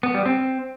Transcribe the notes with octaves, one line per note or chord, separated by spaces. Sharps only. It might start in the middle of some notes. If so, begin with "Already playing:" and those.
B3
G3
C4